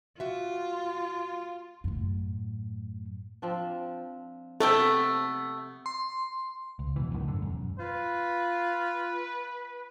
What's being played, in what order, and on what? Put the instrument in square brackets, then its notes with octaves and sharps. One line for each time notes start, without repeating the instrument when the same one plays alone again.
[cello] F4 [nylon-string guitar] F#4 E5
[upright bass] F#2 A2
[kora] F3 C4 D4
[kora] C3 [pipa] A3 B3 G5 [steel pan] A4
[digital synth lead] C6
[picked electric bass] C#2
F1 B2 E3
C#2 F#2 A2 D#3
G#2 D3
E1 F#2
[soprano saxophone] F4 [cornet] B4